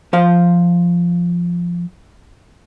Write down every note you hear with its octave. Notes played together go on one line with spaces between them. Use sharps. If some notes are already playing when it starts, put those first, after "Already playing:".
F3 C5 F5